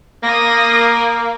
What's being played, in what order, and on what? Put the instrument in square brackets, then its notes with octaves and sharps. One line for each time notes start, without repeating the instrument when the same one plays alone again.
[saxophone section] A#3 [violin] D#6 A#6